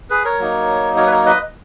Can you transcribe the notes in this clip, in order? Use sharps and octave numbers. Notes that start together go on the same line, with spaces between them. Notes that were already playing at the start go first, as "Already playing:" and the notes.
G#4 B4
A#4 C#5
F#3 A#3 D#4
A#4 C#5
B4
A#4 C#5
B4 D#5